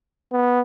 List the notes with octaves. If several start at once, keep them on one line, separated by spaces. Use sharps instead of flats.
B3